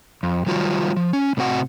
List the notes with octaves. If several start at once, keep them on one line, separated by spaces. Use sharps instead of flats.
F2
D#3 F#3 G3 F4 F#4
F3
C#4
A2 C3 C4 F#4 F#5